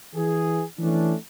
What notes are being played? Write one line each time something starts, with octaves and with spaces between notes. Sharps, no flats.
E3 G#4
E3 A3 C#4 D4